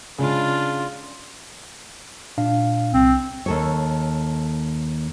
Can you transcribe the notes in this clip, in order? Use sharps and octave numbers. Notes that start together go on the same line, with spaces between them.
C#3 G#3 D4 F4
A#2 D4 F5
C2 C4
D#2 A4 C#5